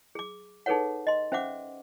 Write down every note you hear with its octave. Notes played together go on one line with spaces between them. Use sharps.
G#4 D6
D#4 G#4 A4 B4 C#5 F#5
D#5 C6
C#4 C5 E5 F#5 D6